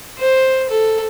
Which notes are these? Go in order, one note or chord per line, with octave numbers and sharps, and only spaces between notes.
C5
A4